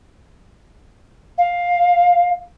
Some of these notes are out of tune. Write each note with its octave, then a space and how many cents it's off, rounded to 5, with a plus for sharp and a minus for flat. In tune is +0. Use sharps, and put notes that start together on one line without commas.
F5 +10